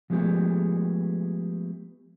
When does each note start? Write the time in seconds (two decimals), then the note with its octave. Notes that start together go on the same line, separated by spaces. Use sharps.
0.10 F3 G#3 A3 B3 G4 G#4